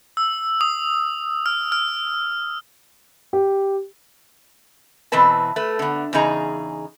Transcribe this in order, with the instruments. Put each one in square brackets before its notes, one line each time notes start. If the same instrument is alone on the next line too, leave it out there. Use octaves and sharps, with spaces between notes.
[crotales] E6
D#6
F6
F6
[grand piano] G4
[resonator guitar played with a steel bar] B2 E3 C4 B4 A5
A3 B4
D3 B3
E2 C#3 D#4 G#4 A#5